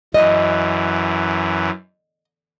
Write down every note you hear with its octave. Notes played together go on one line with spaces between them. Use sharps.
F#2 E3 D#5